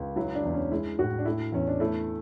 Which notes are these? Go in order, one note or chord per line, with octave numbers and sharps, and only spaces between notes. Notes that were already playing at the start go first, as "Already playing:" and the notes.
Already playing: C#2
F#3 E4
D4
E2
C#4
G#3 E4
A2 F#4
D4
A3 E4
E2 C#4
D4
A3 E4